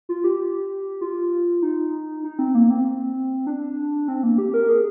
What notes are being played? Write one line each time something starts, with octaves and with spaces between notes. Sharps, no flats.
F4
G4
F4
D#4
D#4
C4
A#3
C4
D4
C4
A#3
G4
A#4
G#4